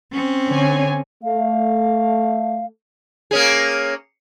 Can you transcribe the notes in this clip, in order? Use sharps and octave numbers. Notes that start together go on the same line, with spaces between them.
C4 C#4
D3 C#5 G#5
A3 F5
A#3 C#4 G#4